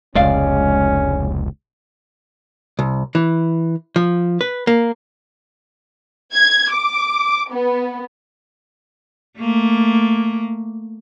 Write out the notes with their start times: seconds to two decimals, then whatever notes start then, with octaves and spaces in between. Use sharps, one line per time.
0.15 F1 C#2 G#3 C#4 D5 F5
2.79 C2
3.15 E3
3.96 F3
4.41 B4
4.67 A#3
6.34 G#6
6.73 D6
7.53 B3
9.39 A3 A#3